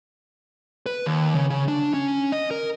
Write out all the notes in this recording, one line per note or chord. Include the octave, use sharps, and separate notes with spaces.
B4
D#2
C#3
C#3
D4
C#4
D#5
A#4